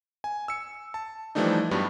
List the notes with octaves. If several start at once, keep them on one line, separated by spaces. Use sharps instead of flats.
G#5
E6 C#7
A5
E3 F3 G3 A3 D4 D#4
G2 F#3 G3 B3